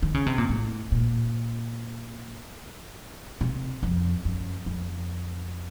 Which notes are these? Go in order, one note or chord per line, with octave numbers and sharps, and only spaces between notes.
D#3
C#3
C3
A#2
A2
A#2
C3
F2
F#2
F2